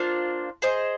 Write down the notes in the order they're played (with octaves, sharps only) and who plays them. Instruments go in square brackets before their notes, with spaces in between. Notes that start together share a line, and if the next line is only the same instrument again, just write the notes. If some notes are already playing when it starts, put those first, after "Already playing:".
Already playing: [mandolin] A#3 D4 F4 C5
G#4 C5 D#5